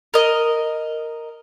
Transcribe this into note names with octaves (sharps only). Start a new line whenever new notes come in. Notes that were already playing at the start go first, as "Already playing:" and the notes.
A#4 D#5